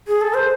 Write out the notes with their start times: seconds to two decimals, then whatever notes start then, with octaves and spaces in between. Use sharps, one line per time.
0.07 G#4
0.21 A4
0.34 C5